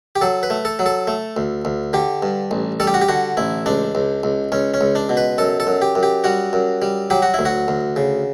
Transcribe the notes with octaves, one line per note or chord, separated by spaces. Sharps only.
G4
F#3 A4
B4
A3
A4
F#3
A4
A3
D2
D2
D3 G4
G2
A1
G3 A4
G4
F#4
G4
D3 F#4
A1 E4
C#2 D4
C#2
C#2
C#2 C#4
C#4
C#2
D4
B2
B4
F#2 A4
A4
F#2
G4
F#2
G4
G3 F#4
F#2
G3
F#3 G4
F#4
E4
D2
F#4
D2
C#3